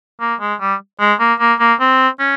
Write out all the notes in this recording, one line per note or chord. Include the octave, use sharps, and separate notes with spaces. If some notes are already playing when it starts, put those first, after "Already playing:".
A#3
G#3
G3
G#3
A#3
A#3
A#3
C4
C#4